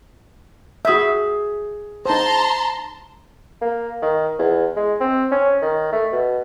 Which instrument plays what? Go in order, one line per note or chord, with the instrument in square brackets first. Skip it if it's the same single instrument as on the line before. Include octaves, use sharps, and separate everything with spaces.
[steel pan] F#4 E5 [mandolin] G#4 G6
[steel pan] D#4 C5 [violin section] A5 A#5 C6
[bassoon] A#3
D#3
E2
G#3
C4
C#4
D#3
A3
B2